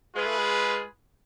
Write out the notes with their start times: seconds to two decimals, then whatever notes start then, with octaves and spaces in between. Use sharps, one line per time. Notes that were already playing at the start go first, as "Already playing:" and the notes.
0.15 G#3 F4 G#4 B4
0.27 A3
0.38 G#3